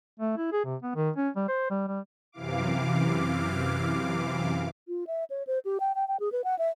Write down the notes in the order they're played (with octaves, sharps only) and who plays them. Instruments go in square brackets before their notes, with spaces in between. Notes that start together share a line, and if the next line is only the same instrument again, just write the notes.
[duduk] A3
E4
G#4
C3
B3
D#3
C#4
G3
C5
G3
G3
[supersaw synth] F#2 C3 E3 F5 D6
[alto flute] F4
E5
C#5
C5
G4
G5
G5
G5
G#4
B4
F#5
E5